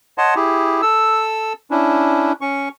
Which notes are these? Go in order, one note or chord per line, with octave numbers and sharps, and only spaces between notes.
C#5 D#5 F#5 A5 C6
E4 G4 G#4
A4 E6
C#4 D4 E4
C#4 C#6